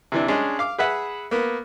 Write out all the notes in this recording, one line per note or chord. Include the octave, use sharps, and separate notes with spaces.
C3 E3 D4
G#3 C#4 D4 G#4
F5 D6
G#4 B4 E5 F#5
A#3 B3